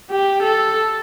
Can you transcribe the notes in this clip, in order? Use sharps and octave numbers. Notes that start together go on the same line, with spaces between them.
G4
A4